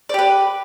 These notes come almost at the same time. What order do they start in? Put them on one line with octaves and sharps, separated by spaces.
D5 G4 B4